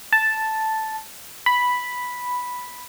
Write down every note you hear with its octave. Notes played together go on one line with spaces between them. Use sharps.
A5
B5